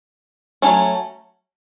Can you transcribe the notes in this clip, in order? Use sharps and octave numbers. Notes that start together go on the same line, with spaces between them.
F#3 A3 C#4